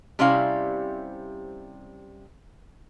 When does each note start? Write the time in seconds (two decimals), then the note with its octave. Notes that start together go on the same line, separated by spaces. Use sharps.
0.19 C3 G3 C4 C#4 E4 F5